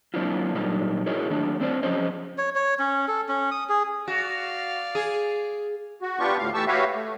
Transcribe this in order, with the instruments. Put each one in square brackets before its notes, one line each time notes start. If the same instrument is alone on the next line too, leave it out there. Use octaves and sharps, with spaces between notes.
[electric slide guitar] F#3 A#3 C4 D4 E4 F4
A#2 F#3 G3 A#3 D4 D#4
E4 F#4 G#4 A#4 C#5 D#5
D#3 F#3 A3 D4
A3 C4 D4 C5 D5
F3 F#3 C#4 G#4 C5 D#5
[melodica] C#5
C#5
C#4
A4
C#4
D#6
G#4
[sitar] F#4 [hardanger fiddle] D5 F5
[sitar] G#4
[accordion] F#4
B3 D4 F4 G4 C#6
D2 A2 F5
E3 A3 G4 A5 C#6 E6
F#4 G4 B4 C#5 E5 F5
A3